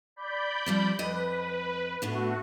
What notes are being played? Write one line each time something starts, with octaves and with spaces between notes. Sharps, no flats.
D5 B5 G6
F3 G3 C4
F2 B4 D#5
A2 A3 B3 D4 F#4